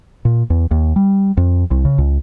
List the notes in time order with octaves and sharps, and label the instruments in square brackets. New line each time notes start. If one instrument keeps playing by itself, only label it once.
[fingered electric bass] A#2
E2
D#2
G3
F2
C2
C#3
C#2